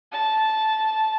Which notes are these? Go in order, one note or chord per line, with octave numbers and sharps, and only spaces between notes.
A5